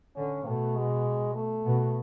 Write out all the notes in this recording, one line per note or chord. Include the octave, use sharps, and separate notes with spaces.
D3 C#4
B2 A3
G#3
A3
B2